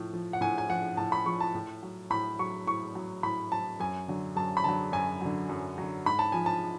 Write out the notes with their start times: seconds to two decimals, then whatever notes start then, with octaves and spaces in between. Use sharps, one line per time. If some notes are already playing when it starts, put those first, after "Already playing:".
Already playing: A2 F3
0.13 F3
0.33 F#5
0.41 A2 G#5
0.58 G#5
0.69 F3 F#5
0.97 A2 A5
1.12 B5
1.26 F3 C#6
1.40 A5
1.55 A2
1.83 F#3
2.10 A2 B5
2.39 F#3 C#6
2.67 A2 C#6
2.95 F#3
3.23 A2 B5
3.52 F#3 A5
3.80 F#2 G#5
4.08 D3 F#3
4.36 F#2 A5
4.57 B5
4.64 D3 F#3 A5
4.92 F#2 G#5
5.21 D3 F#3
5.49 F#2
5.78 D3 F#3
6.06 G#2 B5
6.19 A5
6.32 F3 G#5
6.46 A5